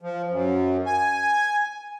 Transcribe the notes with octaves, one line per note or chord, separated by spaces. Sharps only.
F3
F#2
G#5